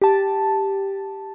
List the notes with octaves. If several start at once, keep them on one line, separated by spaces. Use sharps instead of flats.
G4 A5